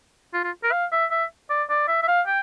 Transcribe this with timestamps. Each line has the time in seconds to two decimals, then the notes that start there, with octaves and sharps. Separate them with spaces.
0.33 F4
0.44 F4
0.63 A#4
0.72 F5
0.92 E5
1.11 E5
1.50 D5
1.69 D5
1.88 E5
2.03 E5
2.08 F5
2.27 G5